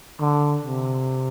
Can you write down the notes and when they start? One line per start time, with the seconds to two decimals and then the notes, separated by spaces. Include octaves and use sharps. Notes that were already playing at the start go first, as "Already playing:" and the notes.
0.20 D3
0.63 C3